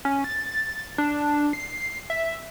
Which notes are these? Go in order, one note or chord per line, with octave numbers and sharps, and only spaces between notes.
C#4
A6
A6
D4
C7
E5